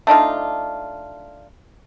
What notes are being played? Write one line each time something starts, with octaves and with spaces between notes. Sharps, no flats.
A3 D4 D#4 F4